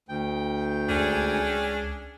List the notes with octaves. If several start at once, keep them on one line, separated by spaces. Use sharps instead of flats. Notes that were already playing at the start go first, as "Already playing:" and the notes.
D2 G5
C#2 C#4 D4 G#4